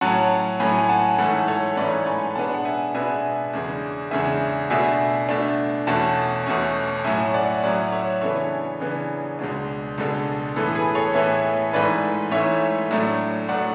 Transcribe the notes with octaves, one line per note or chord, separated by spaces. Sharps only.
A2 F#3 C#4 F#5 A5
A2 F#3 C#4 G#5 B5
G#5
F#5 A5
G#2 E3 A3 C#4 F#5 A5
A4 C#5
G#2 E3 A3 C#4 B4 D5
G#5 B5
B2 G#3 B3 D4 F#5 A5
F#5
E5 G#5
B2 G#3 B3 D4 E5 G#5
E2 C#3 G#3 D4
E2 C#3 G#3 D4 E5 G#5
B2 A3 D4 E5 G#5
B2 A3 D4
E2 B2 A3 C#4 F#5 A5
E2 B2 A3 C#4
A2 F#3 C#4 E5 G#5
D5 F#5
A2 F#3 C#4 D5 F#5
C#5 E5
C#3 E3 B3 D4 A4 C#5
C#3 E3 B3 D4
C#2 B2 G#3 D4
C#2 B2 G#3 D4 A4
A2 E3 B3 A4
G#4 B4
A4 C#5
A2 E3 B3 C#5 E5
G#2 E3 A3 B4 D5
G#2 E3 A3 C#5 E5
A2 F#3 A3 D4
A2 F#3 A3 D4 D5 F#5